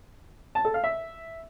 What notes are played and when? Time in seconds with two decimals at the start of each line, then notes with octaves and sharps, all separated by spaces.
0.55 A5
0.65 A4
0.74 F5
0.84 E5